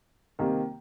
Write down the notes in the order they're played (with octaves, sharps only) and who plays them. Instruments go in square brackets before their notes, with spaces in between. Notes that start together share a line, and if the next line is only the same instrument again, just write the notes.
[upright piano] C2 C3 D#3 A#3